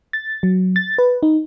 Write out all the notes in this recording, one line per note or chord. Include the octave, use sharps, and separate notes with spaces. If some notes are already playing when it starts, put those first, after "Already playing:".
A6
F#3
A6
B4
D#4